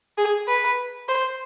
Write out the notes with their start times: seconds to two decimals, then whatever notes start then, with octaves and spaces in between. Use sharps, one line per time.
0.18 G#4
0.48 B4
1.08 C5